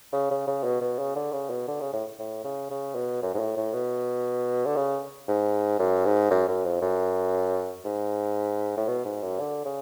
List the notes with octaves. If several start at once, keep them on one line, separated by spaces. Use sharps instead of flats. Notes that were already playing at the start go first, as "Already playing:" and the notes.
C#3
C#3
C#3
B2
B2
C#3
D3
C#3
B2
D3
C#3
A2
A2
C#3
C#3
B2
F#2
G#2
A2
A2
B2
D3
C#3
G#2
F#2
G#2
F#2
F#2
F2
F#2
G#2
A2
B2
G#2
F#2
D3
C#3